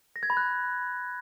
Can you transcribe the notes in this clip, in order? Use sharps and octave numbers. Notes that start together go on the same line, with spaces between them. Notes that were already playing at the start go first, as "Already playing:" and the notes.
A#6
G#6
B5
F#6